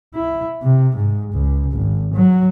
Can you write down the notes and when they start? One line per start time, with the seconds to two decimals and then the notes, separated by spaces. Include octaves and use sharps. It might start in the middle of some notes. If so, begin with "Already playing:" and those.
0.15 E4
0.63 C3
0.96 G#2
1.33 C#2
1.72 G#1
2.14 F#3